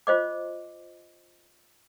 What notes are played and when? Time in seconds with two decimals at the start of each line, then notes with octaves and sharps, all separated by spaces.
0.07 F4 C5 D#5 D6